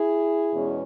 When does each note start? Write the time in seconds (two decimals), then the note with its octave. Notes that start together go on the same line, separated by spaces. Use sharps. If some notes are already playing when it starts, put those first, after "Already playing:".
Already playing: E4 G#4
0.53 E2 B2 G#3 C#4